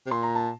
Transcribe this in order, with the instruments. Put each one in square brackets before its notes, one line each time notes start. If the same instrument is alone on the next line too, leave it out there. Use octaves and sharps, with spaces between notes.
[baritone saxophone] C3
[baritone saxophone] A#2 [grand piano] C6
[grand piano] A#5
A5